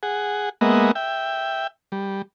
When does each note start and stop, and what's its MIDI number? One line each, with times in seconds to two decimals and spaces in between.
0.03 0.49 68
0.03 0.49 78
0.61 0.91 56
0.61 0.91 58
0.61 0.91 59
0.61 0.91 75
0.61 0.91 76
0.61 0.91 78
0.95 1.67 76
0.95 1.67 79
1.92 2.22 55